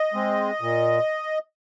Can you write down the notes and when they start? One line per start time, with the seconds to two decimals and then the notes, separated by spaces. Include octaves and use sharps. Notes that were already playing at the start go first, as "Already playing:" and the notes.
Already playing: D#5
0.14 G#3 C4
0.61 A#2